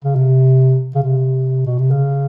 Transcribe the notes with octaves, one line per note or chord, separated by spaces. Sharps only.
C#3
C3
C#3
C3
B2
C3
C#3